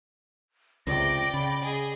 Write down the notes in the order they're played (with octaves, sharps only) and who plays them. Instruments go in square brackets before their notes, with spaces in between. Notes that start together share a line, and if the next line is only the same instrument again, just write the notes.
[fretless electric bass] C#2 C3 [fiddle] D5 G5 [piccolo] A#6
[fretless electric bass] C#3 [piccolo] B5
[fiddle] G#4 D#5 [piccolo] G#5